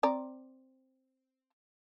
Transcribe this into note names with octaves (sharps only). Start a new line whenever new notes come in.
C4 D5 A#5